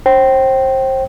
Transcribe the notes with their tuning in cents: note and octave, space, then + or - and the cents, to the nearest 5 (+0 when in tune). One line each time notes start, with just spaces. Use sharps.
C5 +30 G5 -20